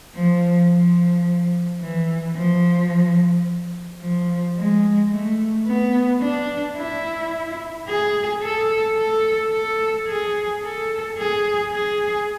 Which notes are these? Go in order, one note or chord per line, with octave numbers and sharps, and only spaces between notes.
F3
F3
E3
F3
F3
G#3
A3
B3
D4
E4
G#4
A4
A4
A4
G#4
A4
G#4
G#4